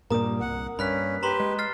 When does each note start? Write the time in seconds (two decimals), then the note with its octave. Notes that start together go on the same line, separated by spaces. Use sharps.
0.10 G2 A#2 G3 A#3 A#5 D#6
0.41 C2 F#5
0.79 G2 C#4 B5 F#6 B6
1.23 G4 B4 A#5 C6 G7
1.40 G#3
1.59 F6 A6 C7